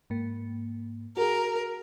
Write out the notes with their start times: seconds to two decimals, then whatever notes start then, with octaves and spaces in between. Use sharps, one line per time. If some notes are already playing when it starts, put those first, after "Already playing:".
0.10 G#2 A#3
1.17 F#4 G#4 A#4